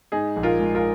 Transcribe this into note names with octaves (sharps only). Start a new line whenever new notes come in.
G#2 D#4 G#4
A#1
F4 A#4
G#3
F4 A#4